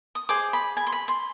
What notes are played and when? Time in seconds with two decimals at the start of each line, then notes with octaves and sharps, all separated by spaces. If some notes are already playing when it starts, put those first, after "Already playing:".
0.15 D#6
0.29 G#4 C5 D#5 D6
0.53 B5
0.77 G#5
0.87 C6
0.93 B5
1.08 C6